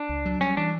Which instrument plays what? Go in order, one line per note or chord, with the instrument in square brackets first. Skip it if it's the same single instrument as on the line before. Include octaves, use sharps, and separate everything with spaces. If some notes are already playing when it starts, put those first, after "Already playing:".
Already playing: [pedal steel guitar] D4
[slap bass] C#2
F#3
[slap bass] G3 [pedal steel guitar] C#4
[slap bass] E3 [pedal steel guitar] D4